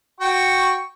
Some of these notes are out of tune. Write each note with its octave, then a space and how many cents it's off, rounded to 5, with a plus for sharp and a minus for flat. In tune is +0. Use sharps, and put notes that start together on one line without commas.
F#4 +0 G5 +0 C#6 +0